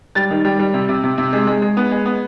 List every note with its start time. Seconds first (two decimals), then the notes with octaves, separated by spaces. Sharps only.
0.15 G3 A6
0.30 D#3
0.45 G3
0.59 G3
0.74 C3
0.89 C3
1.03 C3
1.18 C3
1.33 G#3
1.47 G#3
1.62 G#3
1.77 B3
1.91 G#3
2.05 B3